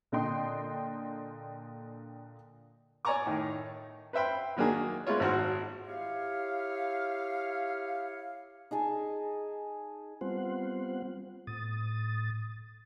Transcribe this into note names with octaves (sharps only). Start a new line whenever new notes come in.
A#2 D3 D#5 G5 C6
C#5 D5 G#5 A#5 C#6 D6
A2 D#3
B4 C5 E5 G5 B5
D#3 F#3 A#3 D4 G#4
G#3 B3 E4 F4 C#5
G#1 D#4 F#4 C5 F#5 F6
E4 G4 C#5 F5
D#4 G#4 G#5 A5
G3 B3 C4 F4 C5 F#5
A2 D#6 A6